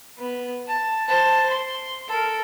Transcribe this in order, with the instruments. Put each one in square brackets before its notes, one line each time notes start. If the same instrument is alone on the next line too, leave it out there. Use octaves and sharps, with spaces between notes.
[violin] B3
A5
C5 A5
C6
A4 A#4